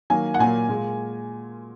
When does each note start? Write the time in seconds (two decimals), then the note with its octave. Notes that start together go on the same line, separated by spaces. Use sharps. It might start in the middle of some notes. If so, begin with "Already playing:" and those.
0.10 D#3 F#3 A#3 G#5
0.34 F#5
0.39 A#2 F#3 A#3 G#5
0.69 A#2 G#3